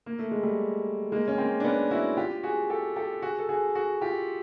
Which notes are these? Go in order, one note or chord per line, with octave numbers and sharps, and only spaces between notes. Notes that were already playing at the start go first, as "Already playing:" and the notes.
A#3
A3
G#3
G3 A3
G#3 A#3
C#4
A#3 C4
D4
B3 C#4
E4 F#4
F4 G4
F#4 G#4
G4 A4
G4 A4
F#4 G#4
A4
F#4 G#4
F#4 G#4
F4 G4